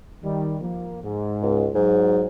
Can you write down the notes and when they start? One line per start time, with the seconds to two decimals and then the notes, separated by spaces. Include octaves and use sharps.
0.23 D#3 G3
0.61 F3 A#3
1.04 G#2
1.42 C#2
1.75 G#2 F#3